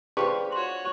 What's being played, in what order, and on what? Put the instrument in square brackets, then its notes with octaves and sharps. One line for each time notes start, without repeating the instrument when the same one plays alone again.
[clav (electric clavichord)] D4 F4 C5 [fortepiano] G4 B4 C#6 [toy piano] G#4 B5
[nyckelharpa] F#4 C#5 [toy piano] C6